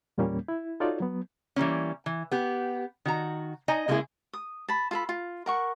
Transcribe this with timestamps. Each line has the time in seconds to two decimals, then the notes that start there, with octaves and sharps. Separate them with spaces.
0.18 E2 A#2 G3 A#3 C#4
0.48 E4
0.80 D#4 F4 F#4 A4 C#5 D5
1.00 F#3 B3
1.56 E3 G3 A#3 C#4
2.06 E3
2.31 B3 G4
3.05 D#3 F#4 A#5
3.68 D#4 D#5 G#5 A#5
3.88 C#3 G#3 A#3 B3 E4 G#4
4.33 D#6
4.69 A5 B5
4.91 F4 A4 B5
5.09 F4
5.46 A#4 F#5 C#6